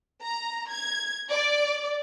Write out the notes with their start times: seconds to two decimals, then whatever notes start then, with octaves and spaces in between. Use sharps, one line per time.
0.22 A#5
0.69 G#6
1.30 D5